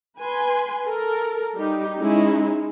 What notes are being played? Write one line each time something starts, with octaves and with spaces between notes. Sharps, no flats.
B4 G#5 C6
A4 A#4
G3 D#4 G4
G#3 C#4 D#4 E4